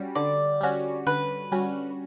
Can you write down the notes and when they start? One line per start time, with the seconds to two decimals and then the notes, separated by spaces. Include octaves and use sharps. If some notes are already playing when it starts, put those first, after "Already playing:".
Already playing: G3 C#4 F#4
0.15 D3 D5
0.61 G3 C#4 F#4
1.07 D3 B4
1.52 G3 C#4 F#4